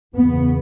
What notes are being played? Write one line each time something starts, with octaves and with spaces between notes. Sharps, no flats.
E2 C#3 B3